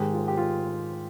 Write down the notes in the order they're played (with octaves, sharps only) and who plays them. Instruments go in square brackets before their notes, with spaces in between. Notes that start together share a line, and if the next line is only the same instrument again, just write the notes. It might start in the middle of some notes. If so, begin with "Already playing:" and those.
Already playing: [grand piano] G#2 D#3 G#3 [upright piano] G4 G#4
[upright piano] F4
G4
F4